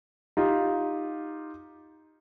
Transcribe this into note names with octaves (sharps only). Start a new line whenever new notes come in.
D#4 F4 G4